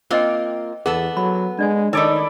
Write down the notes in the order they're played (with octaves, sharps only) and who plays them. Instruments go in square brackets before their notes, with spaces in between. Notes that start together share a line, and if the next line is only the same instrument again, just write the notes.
[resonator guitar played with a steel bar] A#3 C4 F4 [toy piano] C5 D#5 G5
[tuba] E2 [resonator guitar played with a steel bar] B3 A4 [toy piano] G#4
[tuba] F#3 [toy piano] B5
[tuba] G#3 [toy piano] D4 D5 G#5
[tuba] D#3 [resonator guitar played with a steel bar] D#4 C#5 [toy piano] E4 [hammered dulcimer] A4 D5 B5